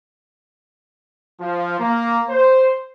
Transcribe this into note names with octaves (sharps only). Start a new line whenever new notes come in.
F3
A#3
C5